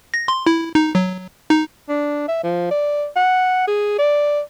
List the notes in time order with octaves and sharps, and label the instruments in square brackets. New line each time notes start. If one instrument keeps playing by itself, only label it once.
[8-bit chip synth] A#6
C6
E4
D#4
F#3
D#4
[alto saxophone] D4
E5
F3
D5
F#5
G#4
D5